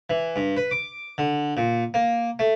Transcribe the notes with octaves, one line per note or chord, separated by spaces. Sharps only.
E3
G2
B4
D6
D3
A#2
A#3
A3